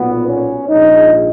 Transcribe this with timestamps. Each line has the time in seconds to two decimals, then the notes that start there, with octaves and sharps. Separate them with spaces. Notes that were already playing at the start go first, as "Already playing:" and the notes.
Already playing: B1 A#2 F#3 B3
0.28 C#4
0.68 A#1 G#2 F3 D#4